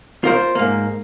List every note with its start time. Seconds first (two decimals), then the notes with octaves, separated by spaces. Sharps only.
0.24 F4 A#4 C5
0.55 G#2 A#3